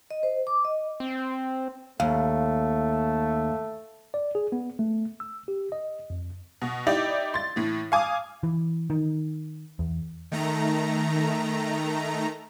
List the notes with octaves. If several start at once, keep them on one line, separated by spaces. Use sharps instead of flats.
D#5
C5
D6
D#5
C4
D#2 A3 F5
D5
G#4
B3
A3
E6
G4
D#5
F2
B2
D#4 E4 G4 D5
C6 A6
A2 E3
F5 G#5 D6 D#6
E3
D#3
E2
D#3 A3 A#5